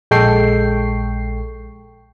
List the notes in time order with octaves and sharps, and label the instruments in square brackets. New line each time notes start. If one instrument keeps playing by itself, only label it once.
[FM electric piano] A#1 G#3 A4 G5 C#6 C7